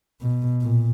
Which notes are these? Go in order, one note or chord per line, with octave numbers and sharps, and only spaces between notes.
B2
A#2